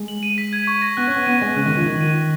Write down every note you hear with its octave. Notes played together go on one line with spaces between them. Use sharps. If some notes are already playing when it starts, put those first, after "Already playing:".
Already playing: G#3
F#7
D#7
B6
G#6
C#6
A#6
B3 F#6
C#4
B3 C#6
B3 D#7
G#3 A#6
C#3 F#6
D#3
F3 C#6
D#3 F#7
D#7
A#6